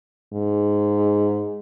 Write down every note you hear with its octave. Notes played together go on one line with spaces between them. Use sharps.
G#2